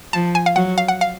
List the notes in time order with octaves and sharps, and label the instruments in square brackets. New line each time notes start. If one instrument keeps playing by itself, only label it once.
[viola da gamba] F3 [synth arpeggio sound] A5
[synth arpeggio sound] G#5
F5
[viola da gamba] F#3 [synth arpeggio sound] F#5
[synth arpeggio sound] F5
F#5
F5